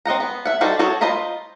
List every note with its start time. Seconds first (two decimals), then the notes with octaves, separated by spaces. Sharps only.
0.05 C4 D#5 F#5 A#5
0.20 B3
0.45 E5 F#5
0.61 G3 D#4 F#4 A4 C5
0.79 F#4 G#4 A4 C#5
1.01 F4 C5 D#5 A#5 B5